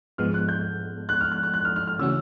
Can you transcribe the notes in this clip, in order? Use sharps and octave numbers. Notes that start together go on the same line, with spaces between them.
G#2 F3 G#3 B3 F6
F#6
G6
F#6
F6
F#6
F#6
F#6
F6
F6
F6
C#3 E3 A3 C#4 F#4 E6